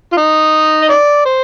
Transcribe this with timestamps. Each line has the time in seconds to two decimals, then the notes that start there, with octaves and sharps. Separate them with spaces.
0.12 F4
0.17 D#4
0.82 D#5
0.89 D5
1.26 C5